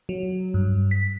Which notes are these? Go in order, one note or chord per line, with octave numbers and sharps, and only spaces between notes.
F#3
G2
B6